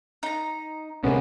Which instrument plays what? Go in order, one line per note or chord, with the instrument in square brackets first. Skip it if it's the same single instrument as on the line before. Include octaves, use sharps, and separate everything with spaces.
[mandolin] D#4 A#5
[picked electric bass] D#1 C3 C#4 [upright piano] G#3 A#3 [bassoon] B3